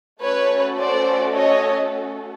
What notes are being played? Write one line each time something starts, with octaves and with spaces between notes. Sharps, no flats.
A3 C#4 F#4 A4 B4 C#5
C5 D5
C#5 D#5